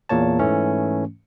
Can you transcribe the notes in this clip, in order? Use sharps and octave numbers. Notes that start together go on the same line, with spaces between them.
E2 A#2 A#3 C#5 A5
G#2 E3 A3 C#4